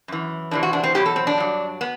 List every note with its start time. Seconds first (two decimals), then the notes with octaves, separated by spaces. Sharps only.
0.08 F#2 E3
0.51 E2 C3 E3 D4
0.63 F#4
0.73 D4
0.84 C4
0.95 E2 B2 F#3 G4
1.06 A4
1.16 C4
1.27 D4
1.38 G2 F#3
1.81 B3